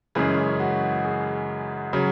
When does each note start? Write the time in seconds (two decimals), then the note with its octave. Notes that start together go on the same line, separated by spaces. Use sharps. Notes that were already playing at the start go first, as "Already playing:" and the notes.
0.15 F#2 C#3 E3 G#3 C#4 G#4
0.60 F#4
1.04 G#4
1.93 C#3 F#3